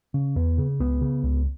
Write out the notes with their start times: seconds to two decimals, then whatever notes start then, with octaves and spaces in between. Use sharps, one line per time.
0.14 C#3
0.36 E2 B3
0.58 C#3
0.80 C#2 B3
1.01 C#3
1.23 C#2